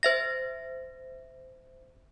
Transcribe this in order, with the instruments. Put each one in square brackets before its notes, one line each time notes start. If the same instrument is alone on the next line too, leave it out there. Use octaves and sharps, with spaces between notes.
[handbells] C5 E5 A#6